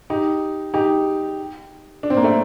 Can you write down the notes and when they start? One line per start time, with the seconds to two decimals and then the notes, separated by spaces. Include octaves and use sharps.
0.10 D#4 G4
0.74 D#4 G4
2.03 D4
2.10 C4
2.17 A#3
2.24 A3 C4